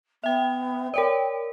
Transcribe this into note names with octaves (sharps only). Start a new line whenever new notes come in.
B3 E5 G5
A#4 C#5 D5 G5